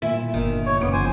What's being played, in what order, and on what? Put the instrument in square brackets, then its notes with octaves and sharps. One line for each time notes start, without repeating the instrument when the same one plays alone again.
[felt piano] A#2 [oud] E4
[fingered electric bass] G1 [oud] D#3
[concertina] C#5
[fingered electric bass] F#1 [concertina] B3 [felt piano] D6 D7
[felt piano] F3 [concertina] C5 G#5